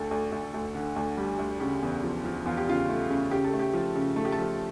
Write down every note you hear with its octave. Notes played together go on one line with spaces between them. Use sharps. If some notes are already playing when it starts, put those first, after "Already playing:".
Already playing: D2 A4
D2
D2
D2
D3
D2
G3
D2
C#3 G4
E2
F3
F3
E2 F4
G4
C#3 F4
A3
C#3
C#3 G4
A4
A3
G4
F3
C#3
A3 A4
G4
A4
F3